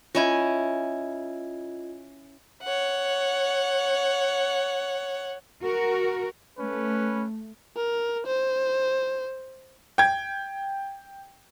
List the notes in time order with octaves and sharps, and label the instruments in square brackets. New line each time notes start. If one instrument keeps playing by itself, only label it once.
[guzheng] C#4 E4 G#5 [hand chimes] F4 D#5 G#6
[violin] C#5 F#5
[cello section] F#4 A#4
[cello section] A3 [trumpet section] C#4 B4
[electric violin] A#4
C5
[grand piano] G5 G#6